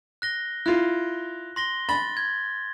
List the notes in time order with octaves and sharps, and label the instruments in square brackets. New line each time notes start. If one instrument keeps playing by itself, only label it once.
[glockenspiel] F#6 A#6 G7
[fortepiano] E4 F4 [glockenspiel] F#6
[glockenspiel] C6 A#6 G7
[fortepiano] B5 [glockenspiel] A6
[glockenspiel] G#6